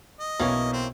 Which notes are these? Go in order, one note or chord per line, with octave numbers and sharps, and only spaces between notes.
D#5
B1 E3 A#3 C#4
C4